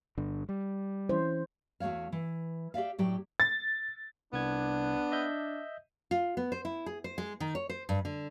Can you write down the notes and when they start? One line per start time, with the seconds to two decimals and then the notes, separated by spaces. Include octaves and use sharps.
0.18 G1 G2 D3
0.49 G3
1.09 E3 C#4 E4 C5
1.80 E2 A3 F#4 C#5 F5
2.12 E3
2.74 G4 D5 E5 F5
2.99 A2 F#3 G4 D5 G5
3.40 A6
4.33 C2 B3 D4 G#6
5.12 D#5 E5 G6
6.11 F4
6.37 B3
6.52 C5
6.65 E4
6.86 G#4
7.04 C5
7.18 G#3
7.40 D#3
7.55 C#5
7.69 C5
7.89 G2
8.05 D3